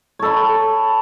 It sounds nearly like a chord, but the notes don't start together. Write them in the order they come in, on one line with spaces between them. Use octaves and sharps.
C#5 A4 B5